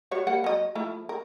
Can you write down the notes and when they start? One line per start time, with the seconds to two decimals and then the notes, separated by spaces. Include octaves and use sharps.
0.11 G3 F#4 C#5
0.27 G3 A#3 F#5
0.44 F#3 D#5
0.75 F3 A3 E4
1.09 A#4